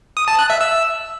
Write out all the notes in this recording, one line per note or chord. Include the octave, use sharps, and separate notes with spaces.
D#6
A5
F#6
E5
E6